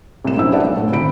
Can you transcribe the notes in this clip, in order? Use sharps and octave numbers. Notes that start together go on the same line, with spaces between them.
C2 A2 E7
A#1 F#2 C4 E4 E6
G4 B4 D5 E5 F#5 A5
B1
A2
G#1 C4 B5 D7